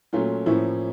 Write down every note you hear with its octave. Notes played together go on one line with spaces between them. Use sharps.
A#2 F#3 A3 C#4 F4
A2 F3 A#3 C#4 E4